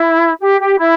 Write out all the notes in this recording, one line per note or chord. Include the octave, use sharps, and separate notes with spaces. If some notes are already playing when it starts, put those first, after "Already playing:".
Already playing: E4
G4
G4
E4